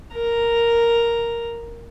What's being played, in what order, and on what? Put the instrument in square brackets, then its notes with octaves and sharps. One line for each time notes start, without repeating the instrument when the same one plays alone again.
[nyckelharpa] A#4 A#5